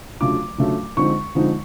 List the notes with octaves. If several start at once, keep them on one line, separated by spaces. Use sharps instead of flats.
C#3 F#3 A3 D4 F4 D6
C#3 F#3 A3 D4 F4
D3 F3 G#3 C4 D#4 C#6
D3 F3 G#3 C4 D#4